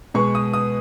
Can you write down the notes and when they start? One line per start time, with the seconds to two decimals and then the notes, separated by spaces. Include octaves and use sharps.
0.14 B2 G#3 B3 C#6
0.35 D#6
0.53 D#6